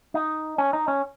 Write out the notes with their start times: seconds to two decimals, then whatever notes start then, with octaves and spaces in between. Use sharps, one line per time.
0.14 D#4
0.58 C#4
0.73 D#4
0.88 C#4